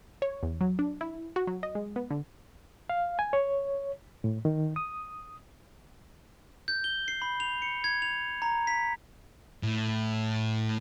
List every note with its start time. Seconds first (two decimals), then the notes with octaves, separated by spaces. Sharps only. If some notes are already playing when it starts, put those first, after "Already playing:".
0.22 C#5
0.43 E2
0.61 F#3
0.79 D4
1.01 E4
1.36 F#4
1.47 F#3
1.63 D#5
1.75 G#3
1.96 B3
2.11 D3
2.89 F5
3.19 G#5
3.33 C#5
4.24 A2
4.45 D#3
4.76 D#6
6.68 G6
6.84 G7
7.08 C7
7.22 B5
7.40 F7
7.62 C#7
7.84 G#6
8.02 F7
8.42 A#5
8.67 B6
9.63 A2